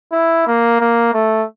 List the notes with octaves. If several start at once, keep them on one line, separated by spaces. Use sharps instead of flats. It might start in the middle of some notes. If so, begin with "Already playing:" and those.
E4
A#3
A#3
A3